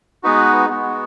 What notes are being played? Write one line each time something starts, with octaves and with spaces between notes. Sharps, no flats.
G#3 B3 D#4 F#4 B4
G#3 B3 F#4